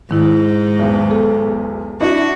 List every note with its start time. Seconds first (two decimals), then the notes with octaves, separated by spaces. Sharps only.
0.11 G#2 D#3 E4
0.79 B1 E2
1.11 A4
2.01 D4 E4 F#4 D#5